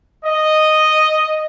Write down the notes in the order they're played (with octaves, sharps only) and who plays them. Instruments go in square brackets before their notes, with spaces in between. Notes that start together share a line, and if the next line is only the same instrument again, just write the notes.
[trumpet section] D#5